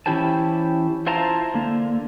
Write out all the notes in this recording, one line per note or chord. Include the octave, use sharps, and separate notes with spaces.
E3 C#4 E4 G4 C5 A5
E4 F4 C5 F5 A5 A#5
D3 A#3